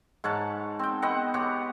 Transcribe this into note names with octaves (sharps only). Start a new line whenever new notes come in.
G#2 C#5 F#5 A5
C4 G5
B3 C4 D#5 F#5
B3 G4 C#5 F#5